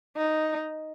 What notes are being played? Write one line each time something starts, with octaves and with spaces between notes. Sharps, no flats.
D#4